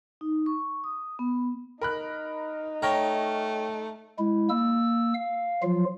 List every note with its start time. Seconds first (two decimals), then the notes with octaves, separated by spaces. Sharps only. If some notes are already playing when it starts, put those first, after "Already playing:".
0.21 D#4
0.46 C#6
0.84 D#6
1.19 B3
1.81 D#4 A#4 B5 F#6
2.82 A3 C#5 G5 A#5 F6 A#6
4.18 G#3 E4
4.49 A#3 E6
5.15 F5
5.63 F3 F#3 F4